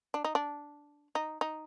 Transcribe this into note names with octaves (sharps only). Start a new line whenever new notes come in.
D4
D#4
D4
D#4
D#4